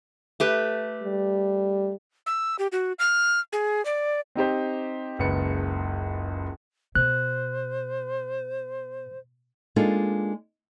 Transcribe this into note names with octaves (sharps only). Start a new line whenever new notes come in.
A3 G4 B4
G3
E6
G4
F#4
F6
G#4
D5
C4 D#4 G4 C5
F#1 C#2 B4 C#7
B2 C5 F#6
G#3 A#3 D4 D#4 F4 A4